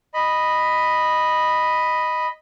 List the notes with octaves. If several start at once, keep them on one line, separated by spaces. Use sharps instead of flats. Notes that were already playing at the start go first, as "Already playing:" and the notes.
D#5 B5